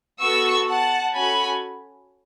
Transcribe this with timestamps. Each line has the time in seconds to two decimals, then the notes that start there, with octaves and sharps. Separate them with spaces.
0.21 B3 F#4 A4 C#6 E6
0.68 F#5 A5
1.14 C#4 F#4 A4 G#5 B5